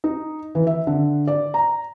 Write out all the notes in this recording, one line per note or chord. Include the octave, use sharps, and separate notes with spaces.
D#4
E3
E5
D3
D5
A#5